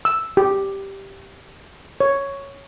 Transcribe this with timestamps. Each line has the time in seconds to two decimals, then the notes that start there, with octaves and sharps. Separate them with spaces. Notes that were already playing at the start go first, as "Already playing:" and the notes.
0.05 E6
0.37 G4
2.00 C#5